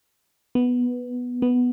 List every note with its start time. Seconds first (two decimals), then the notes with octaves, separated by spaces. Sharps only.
0.55 B3
1.42 B3